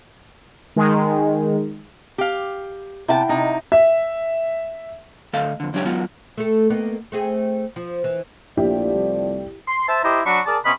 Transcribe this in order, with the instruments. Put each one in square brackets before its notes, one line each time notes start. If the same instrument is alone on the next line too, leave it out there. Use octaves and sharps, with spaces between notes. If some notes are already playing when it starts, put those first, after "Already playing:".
[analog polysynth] D#3 G#3
[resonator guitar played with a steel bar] G4 F5
[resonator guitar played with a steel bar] C3 A5 [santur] E4 F#5 G5
[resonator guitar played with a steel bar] C3 D#4
[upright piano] E5
[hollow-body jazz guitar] D2 A3 A4 D#5 F5 A5
F2 D3
C#2 F#3 D4 G4 C#5
F#3 G#3 B3 D#4 F4 F#4
[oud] A3 A4
A#3 B3 D#4
A3 C4 G#4
F3
E3
[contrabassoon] A#1 [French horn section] F3 A3 D5 [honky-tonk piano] E4 G4
[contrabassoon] C2
[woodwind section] C6
C5 E5 A5
E4 G4 C5 D#5 A#5
F#3 D4 F#4 B5 C#6
G#4 A#4 D5 A5
C3 B3 C#4 D#5 B5